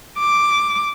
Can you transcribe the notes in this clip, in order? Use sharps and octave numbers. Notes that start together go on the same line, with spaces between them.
D6